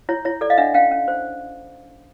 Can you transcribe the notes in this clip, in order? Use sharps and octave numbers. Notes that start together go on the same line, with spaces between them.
E4 C#5
E4 C#5
A4 D5
D#5 F5
D4 E5 F#5
C#4 F5 G5
C#4
C5